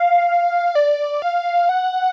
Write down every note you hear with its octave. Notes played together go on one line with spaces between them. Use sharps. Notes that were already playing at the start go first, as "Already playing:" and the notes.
Already playing: F5
D5
F5
F#5